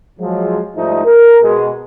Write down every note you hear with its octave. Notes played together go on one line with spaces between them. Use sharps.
F3 F#3 G#3
G#2 F3 G3 A3 D#4
A#4
B2 G#3